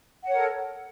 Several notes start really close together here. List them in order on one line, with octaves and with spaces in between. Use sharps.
F#5 C#5 A#4 A4